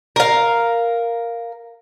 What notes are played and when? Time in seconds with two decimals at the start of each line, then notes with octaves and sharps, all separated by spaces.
0.16 A#4 F5